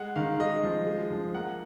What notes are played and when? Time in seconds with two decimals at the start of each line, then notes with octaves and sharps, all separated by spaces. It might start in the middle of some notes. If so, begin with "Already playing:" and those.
Already playing: G#3 F#5
0.16 D#3 F5
0.40 G#3 D#5
0.64 F3
0.87 G#3
1.11 F3
1.34 A#3 F#5